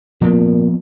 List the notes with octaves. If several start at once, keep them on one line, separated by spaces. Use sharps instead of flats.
A#2 F3 B3 C4